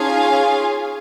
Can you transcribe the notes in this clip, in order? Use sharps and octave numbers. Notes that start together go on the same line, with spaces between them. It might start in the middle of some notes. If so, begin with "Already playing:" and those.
Already playing: C#4 D#4 F4 G#4 F5 G#5